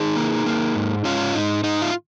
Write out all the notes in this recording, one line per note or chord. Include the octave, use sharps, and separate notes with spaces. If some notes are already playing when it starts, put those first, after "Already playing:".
Already playing: D#3 D#4 G#4
A#3
A#3
G#2
G#2 C#4 F4
G#2 D#4
G#2 D#4
F4